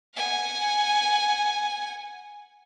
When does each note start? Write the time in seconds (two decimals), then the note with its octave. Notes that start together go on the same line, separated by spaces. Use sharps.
0.15 F#5 G#5